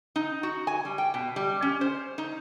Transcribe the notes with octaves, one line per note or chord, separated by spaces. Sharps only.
D#4
F#4
G#5
G3
G5
B2
G3
C#4
C5
D#4